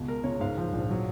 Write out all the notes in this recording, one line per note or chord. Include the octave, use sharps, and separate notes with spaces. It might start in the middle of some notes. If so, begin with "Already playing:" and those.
Already playing: C#2 B2
G#3 A#4
C#2 C#5
G#2 F5
F3
A#1
F#3